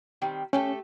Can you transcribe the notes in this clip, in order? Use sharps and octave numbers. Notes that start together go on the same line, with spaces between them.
D#3 G3 C4
A3 C#4 G4 A4